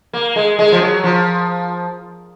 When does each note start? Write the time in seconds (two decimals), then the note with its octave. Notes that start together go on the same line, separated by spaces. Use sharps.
0.13 A#3
0.36 G#3
0.59 G#3
0.72 F3
0.81 F#3
1.04 F3